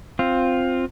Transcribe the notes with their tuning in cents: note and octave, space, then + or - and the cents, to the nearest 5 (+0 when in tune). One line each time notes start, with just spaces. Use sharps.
C4 +0 F4 +10